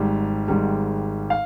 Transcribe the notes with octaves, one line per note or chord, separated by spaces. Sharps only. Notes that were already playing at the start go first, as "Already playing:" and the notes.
Already playing: G#1 G#2 G3
G#1 G#2 G3
F5